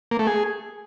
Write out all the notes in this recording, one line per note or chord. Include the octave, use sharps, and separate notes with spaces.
A#3
A3
G#4